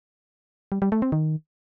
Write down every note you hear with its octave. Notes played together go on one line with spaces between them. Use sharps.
G3
G3
A3
C4
D#3